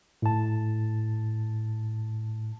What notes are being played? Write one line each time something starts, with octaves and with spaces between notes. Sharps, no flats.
A2 A5